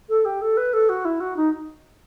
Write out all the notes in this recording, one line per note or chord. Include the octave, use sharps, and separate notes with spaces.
A4
G4
A4
B4
A4
F#4
E4
F#4
D#4